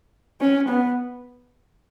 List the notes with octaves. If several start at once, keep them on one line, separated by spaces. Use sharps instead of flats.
C#4
B3